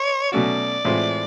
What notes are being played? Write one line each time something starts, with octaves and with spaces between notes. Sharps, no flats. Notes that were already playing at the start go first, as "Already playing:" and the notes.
Already playing: C#5
B2 F#3 A3 C#4 F#4 D5
A2 E3 G#3 C4 F4